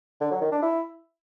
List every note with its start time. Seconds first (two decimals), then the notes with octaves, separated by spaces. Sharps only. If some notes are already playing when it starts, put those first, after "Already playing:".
0.21 D3
0.31 F#3
0.41 D#3
0.52 D4
0.62 E4